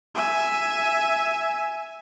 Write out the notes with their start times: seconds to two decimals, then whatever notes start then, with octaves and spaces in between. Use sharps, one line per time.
0.15 E5 G#5